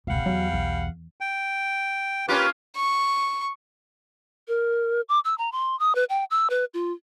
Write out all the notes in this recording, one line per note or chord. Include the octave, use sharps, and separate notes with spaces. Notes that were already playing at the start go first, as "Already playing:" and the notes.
F1 C#2 B2 G3 F5 F#5
E2 F#3
B1
G5
A#3 C#4 F4 G4 B4 D6
C#6
A#4
D6
E6
A#5
C6
D#6
B4
G5
E6
B4
F4